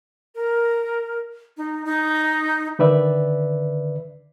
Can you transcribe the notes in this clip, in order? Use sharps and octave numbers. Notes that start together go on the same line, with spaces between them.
A#4
D#4
D#4
D3 D#3 B4 D5 E5